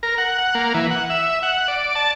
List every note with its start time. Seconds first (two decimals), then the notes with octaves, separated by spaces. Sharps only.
0.03 A#4
0.18 F#5
0.38 F#5
0.55 A#3
0.74 E3
0.91 F#5
1.10 E5
1.43 F#5
1.68 D5
1.95 A5